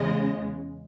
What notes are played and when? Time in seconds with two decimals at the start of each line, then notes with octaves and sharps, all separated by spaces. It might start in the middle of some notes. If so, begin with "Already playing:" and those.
Already playing: E2 C#3 G#3 D#5